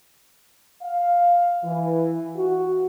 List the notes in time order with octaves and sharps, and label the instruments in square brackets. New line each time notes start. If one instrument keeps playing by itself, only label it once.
[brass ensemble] F5
E3
F#4